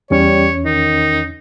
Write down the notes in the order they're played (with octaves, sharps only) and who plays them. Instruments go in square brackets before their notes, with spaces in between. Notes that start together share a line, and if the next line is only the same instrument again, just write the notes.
[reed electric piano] E2 C#4 [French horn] G3 [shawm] C#5
[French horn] D#3 [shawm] D#4